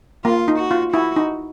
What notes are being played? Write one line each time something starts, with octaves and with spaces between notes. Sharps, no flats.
A#3 F4
D#4
F#4
F4
E4 F#4
D#4